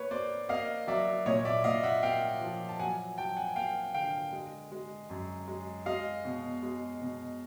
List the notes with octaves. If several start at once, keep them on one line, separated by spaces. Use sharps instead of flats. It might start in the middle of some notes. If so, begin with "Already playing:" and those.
Already playing: A#3 B4 C#5
A#3 C5 D5
A#3 D#5 F5
F#3 D5 E5
A#2 C#5 D#5
D5 E5
A#2 D#5 F5
E5 F#5
A#3 F5 G5
F3
A5
F#3 F#5 G#5
F#3 G5 A5
F#5 G#5
A#3 F5 G5
D3 F5 G5
G#3
G#3
F#2
G#3
G#3 D#5 F5
B2
G#3
B2